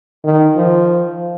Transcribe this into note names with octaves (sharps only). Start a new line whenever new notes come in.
D#3
F3